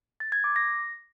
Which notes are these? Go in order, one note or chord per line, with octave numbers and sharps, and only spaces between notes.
A6
G#6
D6
A#6